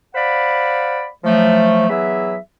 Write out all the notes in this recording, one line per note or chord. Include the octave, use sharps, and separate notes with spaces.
C5 D5 F5 F#5 B5
F3 F#3 A3
E3 F#3 B3 G#4 E5